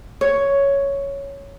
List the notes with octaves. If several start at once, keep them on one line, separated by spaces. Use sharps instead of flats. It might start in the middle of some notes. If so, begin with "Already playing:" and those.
C#5